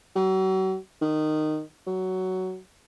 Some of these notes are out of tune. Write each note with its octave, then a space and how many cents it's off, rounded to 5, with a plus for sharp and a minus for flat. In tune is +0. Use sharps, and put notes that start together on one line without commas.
F#3 +40
D#3 -15
F#3 +10